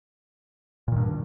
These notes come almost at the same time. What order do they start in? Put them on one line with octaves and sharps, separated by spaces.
A#2 D#3 G2